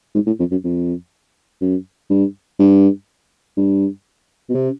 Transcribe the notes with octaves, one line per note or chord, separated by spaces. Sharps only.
G#2
A2
F2
F#2
F2
F#2
G2
G2
G2
B2
C3